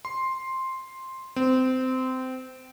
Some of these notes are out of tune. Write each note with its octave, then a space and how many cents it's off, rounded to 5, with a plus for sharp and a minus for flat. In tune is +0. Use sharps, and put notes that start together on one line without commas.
C6 +5
C4 -20